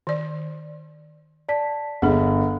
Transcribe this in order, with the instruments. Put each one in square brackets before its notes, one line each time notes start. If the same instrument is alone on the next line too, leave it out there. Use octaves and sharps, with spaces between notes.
[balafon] D#3 D5
[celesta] D5 A5 B6
[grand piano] G1 [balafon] D4 G#4 [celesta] F#5